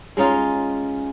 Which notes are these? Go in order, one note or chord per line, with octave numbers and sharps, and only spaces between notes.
G#3 C#4 D#4 F4